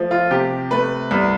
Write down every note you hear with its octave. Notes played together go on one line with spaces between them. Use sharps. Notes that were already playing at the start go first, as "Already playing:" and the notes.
Already playing: F3 A3
F4
C3 G4
A3 B4
C2